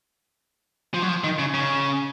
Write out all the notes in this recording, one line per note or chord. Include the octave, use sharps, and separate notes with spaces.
F3
F#3
F3
D#3
C#3
C#3